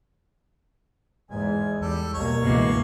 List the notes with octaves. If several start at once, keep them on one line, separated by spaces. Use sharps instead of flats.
E2 G#2 G#5
E2 G3 A4
C2 B2 A#3 C#5
C#2 G2 B2 E3 A#3